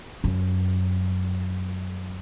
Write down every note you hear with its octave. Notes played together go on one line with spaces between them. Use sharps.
F#2